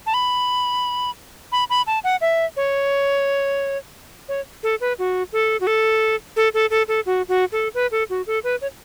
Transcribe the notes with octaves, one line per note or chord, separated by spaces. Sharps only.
A5
B5
B5
B5
A5
F#5
E5
C#5
C#5
A4
B4
F#4
A4
F#4
A4
A4
A4
A4
A4
F#4
F#4
A4
B4
A4
F#4
A4
B4
C#5